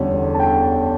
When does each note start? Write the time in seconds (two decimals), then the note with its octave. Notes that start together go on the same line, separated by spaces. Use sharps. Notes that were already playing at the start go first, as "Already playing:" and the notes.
Already playing: E2 D3 G3 C#4
0.34 A5
0.40 G5